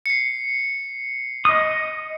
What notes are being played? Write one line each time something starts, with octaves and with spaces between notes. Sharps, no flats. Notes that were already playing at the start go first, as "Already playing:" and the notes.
C7 C#7
D#5 D#6